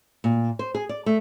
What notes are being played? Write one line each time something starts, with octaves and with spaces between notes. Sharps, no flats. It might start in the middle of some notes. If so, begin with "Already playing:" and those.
A#2
C5
G#4
D5
A3